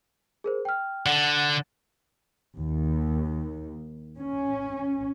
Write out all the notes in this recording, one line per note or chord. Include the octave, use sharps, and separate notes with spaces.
G#4 A#4 C5
G5 F6
D3 F#5
D#2
C#4